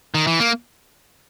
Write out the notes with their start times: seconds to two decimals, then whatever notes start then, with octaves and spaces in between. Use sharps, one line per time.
0.14 D#3
0.27 E3
0.40 A#3